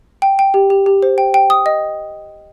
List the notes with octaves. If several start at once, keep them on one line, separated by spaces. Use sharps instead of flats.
G5
G5
G4
G4
G4
C5
G5
G5
D#6
D#5